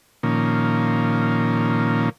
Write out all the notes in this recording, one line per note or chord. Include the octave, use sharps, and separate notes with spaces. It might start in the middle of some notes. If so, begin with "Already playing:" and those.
A#2 D#3 F3 A#3 C#4